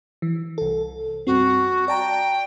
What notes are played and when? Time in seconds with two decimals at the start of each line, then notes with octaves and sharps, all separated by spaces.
0.22 E3
0.58 C2 A4
1.27 G2 C4 F#4
1.88 D5 G5 A5 A#5